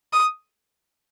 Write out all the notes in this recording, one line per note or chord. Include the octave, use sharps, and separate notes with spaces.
D#6